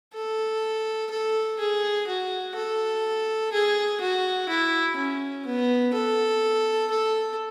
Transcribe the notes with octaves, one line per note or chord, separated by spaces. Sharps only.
A4
A4
G#4
F#4
A4
G#4
F#4
E4
C#4
B3
A4
A4